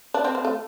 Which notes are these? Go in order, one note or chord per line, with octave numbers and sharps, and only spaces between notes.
D4
C4
C4
A3